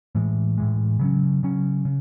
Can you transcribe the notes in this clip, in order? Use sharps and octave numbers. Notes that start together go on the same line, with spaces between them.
A2 E3 G#3
A2 E3 G#3
C#3 F#3 C#4
C#3 F#3 C#4
C#3